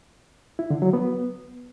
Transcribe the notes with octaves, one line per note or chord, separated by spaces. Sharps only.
E4
D3
F#3
B3